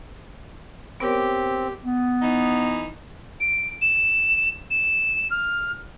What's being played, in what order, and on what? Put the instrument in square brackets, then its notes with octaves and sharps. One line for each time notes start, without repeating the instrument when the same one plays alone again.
[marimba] B3 A#4 C#5 [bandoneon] C4 [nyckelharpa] G4
[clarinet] B3
[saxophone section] E3 D#4
[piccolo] D7
E7
E7
F6